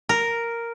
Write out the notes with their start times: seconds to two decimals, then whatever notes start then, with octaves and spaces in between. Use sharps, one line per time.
0.09 A#4